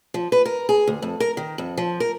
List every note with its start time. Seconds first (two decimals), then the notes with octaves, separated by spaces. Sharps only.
0.14 F3
0.32 B4
0.45 A#4
0.69 G#4
0.87 D2
1.02 F2
1.20 A#4
1.37 D#3
1.58 F2
1.78 F3
2.00 A#4